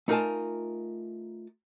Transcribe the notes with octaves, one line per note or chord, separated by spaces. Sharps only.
A3 D#4 F4 A#4 G#5 A5